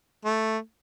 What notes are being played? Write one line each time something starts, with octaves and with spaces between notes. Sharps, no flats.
A3